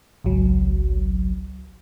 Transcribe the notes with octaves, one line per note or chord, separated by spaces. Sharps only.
G#1 C#2 F#3